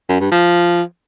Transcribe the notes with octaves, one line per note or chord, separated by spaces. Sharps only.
F#2
G2
F3